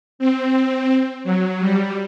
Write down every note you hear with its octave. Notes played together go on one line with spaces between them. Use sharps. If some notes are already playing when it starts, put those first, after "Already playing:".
C4
F#3
G3